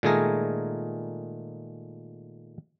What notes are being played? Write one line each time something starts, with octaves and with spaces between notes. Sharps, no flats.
A#2 D#3 G#3 A3 G#4 A#4